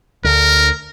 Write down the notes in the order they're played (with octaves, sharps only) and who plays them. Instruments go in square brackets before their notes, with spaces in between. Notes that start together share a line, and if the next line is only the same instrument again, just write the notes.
[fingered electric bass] D2 D3 [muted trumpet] A#4